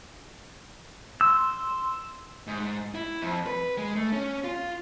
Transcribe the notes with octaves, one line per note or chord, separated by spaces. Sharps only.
C6 E6
G#2
E4
F2
B4
G#3
A3
C#4
F4